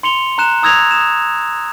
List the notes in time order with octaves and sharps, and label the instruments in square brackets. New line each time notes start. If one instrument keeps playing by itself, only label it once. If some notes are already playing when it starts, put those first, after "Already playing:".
[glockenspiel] C6 C#7 F7 G7
A#5 F#6 E7
A#5 D#6 E6 G#6 A#6 F7
D#6 E7